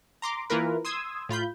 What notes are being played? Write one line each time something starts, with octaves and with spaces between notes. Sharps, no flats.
A#5 C6 D6
E3 A#3 F4 A#4 B4
C6 D#6 E6 G#6
A2 F4 B5 G6